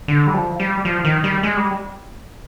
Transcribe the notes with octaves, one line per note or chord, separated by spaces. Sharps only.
D3
G3
F3
G3
F3
D#3
G3
G#3
G3